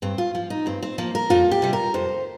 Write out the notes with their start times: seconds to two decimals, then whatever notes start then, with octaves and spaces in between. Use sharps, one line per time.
0.02 G2 C4
0.18 F4
0.34 F3 F4
0.50 D#4
0.66 G2 C4
0.83 C4
0.98 F3 A#3
1.15 A#4
1.30 F2 F4
1.51 G4
1.62 C3 G3
1.73 A#4
1.94 F2 C5